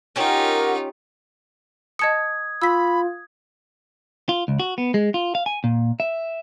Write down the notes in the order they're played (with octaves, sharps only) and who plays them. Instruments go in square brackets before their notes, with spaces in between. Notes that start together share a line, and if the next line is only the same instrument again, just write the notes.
[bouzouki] C#4 G4 C#5 [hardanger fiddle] D#4 F4 [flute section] A#4 F#5
[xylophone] D#5 A5 C#7 [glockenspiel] D#6 G#6
[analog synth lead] F4 [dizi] B5 [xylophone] E6 B6
[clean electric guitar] F4
C#2
F#4
B3
G#3
F4
F5
G#5
A#2
E5